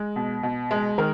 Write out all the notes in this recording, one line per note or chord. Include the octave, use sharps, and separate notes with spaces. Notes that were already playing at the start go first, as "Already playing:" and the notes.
Already playing: G#3
B2
B2
G#3
D#3 A#4